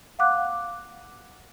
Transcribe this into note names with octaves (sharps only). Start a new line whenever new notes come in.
F5 F#5 D6 F#6